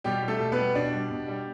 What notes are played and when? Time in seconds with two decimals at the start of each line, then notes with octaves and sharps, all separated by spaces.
0.04 B2 G3 G4
0.23 G3
0.28 A3 A4
0.40 B2
0.52 B3 B4
0.58 G3
0.75 B2 D4 D5
0.93 G3
1.11 B2
1.28 G3